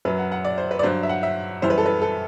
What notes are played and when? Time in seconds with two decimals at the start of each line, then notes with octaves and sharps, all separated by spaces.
0.05 F#2 F#3 B4
0.19 F#5
0.32 F#5
0.45 D5
0.58 C5
0.71 B4
0.79 D5
0.83 G2 F#3 C5
1.03 E5
1.09 F#5
1.23 E5
1.62 F#2 E3 G3 C5
1.70 B4
1.78 A4
1.86 B4
2.02 A4